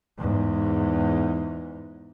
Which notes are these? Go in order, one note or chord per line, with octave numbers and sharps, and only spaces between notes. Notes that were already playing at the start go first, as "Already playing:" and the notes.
E2 G#2